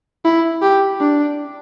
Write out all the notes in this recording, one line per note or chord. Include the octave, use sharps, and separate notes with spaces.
E4
G4
D4